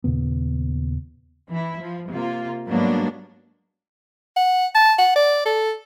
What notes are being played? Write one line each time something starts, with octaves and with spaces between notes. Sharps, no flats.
D#2 A#2 C#3 B3
E3 E4
F3
C3 A#3 F4
G#2 F#3 G3 A#3 B3 D4
F#5
A5
F#5
D5
A4